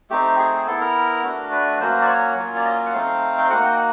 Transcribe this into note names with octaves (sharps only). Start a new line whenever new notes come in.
A3 C4 D#4 G4
G#4
G#4
B3 E4 A4
A#4
A3 D4 F#4
B4
F#3 A#3 C#4 F#4 C5
D5
C#5
F#3 A#3 C#4 F4
D5
D#5
F#5
A3 C4 D#4 F5
G5
A#3 D#4 F#4 F#5
G5